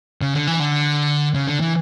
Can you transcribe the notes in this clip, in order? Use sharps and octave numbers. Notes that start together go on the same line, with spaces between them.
C#3
D3
E3
D3
C#3
D3
E3